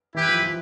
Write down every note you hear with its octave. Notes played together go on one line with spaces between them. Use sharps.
E3 E4 G4 B4
F3
F3